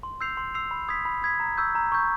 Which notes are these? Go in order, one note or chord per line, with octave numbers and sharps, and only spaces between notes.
C6
E6 G6 C7 F7
C6
E6 G6 C7 F7
B5
D#6 G#6 B6
B5
D#6 G#6 B6
A#5
C#6 E6 G6
A#5
C#6 E6 G6